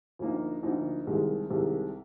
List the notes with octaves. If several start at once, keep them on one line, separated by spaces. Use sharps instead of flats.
D2 D3 F3 A#3 D#4
D2 D3 F3 A#3 D#4
C2 C3 D#3 G#3
C2 C3 D#3 G#3